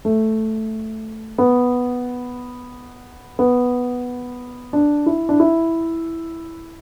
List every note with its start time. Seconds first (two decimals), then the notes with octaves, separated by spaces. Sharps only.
0.05 A3
1.38 B3
3.39 B3
4.73 D4
5.06 E4
5.29 D4
5.40 E4